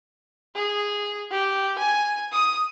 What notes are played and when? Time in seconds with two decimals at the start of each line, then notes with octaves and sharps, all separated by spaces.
0.56 G#4
1.31 G4
1.78 G#5
2.32 D#6